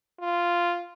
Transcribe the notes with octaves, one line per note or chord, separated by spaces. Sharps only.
F4